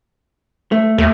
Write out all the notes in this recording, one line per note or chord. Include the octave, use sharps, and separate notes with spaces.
A3
D#2 A3